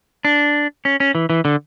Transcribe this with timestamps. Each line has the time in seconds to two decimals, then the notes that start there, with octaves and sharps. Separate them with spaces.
0.25 D4
0.85 C#4
1.00 C#4
1.15 E3
1.30 E3
1.45 D3